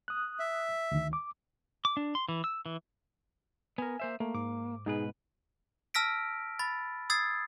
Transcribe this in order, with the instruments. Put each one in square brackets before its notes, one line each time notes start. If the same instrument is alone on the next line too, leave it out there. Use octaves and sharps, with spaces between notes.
[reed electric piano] D#6 F#6
[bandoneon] E5
[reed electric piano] D2 D#3
D6
[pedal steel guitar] D6
D4
C6
E3
E6
E3
[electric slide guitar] B3 A#4 [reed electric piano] G#5
[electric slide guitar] A#3 C5 E5
[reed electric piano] A3 [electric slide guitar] A#3
[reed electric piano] G#2 D6
[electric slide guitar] G#2 B2 B4 [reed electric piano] D#4 G#4
[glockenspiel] A5 E6 F6 A#6 B6 D7
B5 A6
D#6 E6 G#6 A6 C7